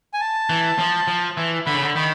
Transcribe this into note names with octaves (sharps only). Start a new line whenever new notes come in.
G#5
A5
E3
F3
F3
E3
D3 B5
C#3
D3
D#3 B5